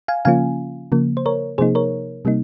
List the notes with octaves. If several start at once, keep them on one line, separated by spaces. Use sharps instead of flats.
F5 G#5
C#3 F3 A#3 C#4 F4 F5 G#5
C#3 F3 A#3
C5
A#4 C#5
C3 F3 A#3 D#4 G#4 C5
A#4 C#5
C3 G3 A#3 D#4